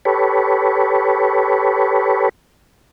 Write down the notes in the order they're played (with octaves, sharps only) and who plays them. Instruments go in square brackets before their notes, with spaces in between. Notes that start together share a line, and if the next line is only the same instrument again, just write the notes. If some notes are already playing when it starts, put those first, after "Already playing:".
[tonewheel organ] G4 A4 B4 C#5